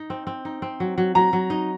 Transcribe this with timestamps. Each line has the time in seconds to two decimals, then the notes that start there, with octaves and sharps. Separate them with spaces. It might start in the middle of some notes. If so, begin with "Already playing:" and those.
Already playing: D#4
0.10 C4
0.27 C4
0.45 D#4
0.62 C4
0.80 F#3
0.98 F#3
1.15 F#3 A#5
1.33 F#3
1.50 D#4